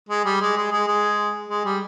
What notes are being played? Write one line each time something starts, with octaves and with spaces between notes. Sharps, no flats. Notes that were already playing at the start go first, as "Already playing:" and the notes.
G#3
G3
G#3
G#3
G#3
G#3
G#3
G3